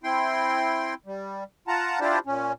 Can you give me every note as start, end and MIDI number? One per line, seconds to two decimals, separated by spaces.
0.04 0.94 60
0.04 0.94 64
0.04 0.94 79
0.04 0.94 84
1.06 1.44 55
1.68 2.00 65
1.68 2.00 78
1.68 2.00 81
1.68 2.00 82
2.00 2.19 62
2.00 2.19 64
2.00 2.19 65
2.00 2.19 67
2.00 2.19 72
2.00 2.19 74
2.26 2.53 46
2.26 2.53 61